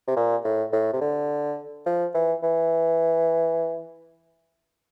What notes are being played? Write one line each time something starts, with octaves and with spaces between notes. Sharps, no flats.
C3
A#2
A2
A2
C3
D3
F3
E3
E3